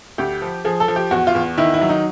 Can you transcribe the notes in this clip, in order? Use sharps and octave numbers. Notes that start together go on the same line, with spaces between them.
D2 G4
F3
F3 G#4
A4
F3
G4
E2 F#4
F4
E2
D#3 E4
E4
F#3
D#4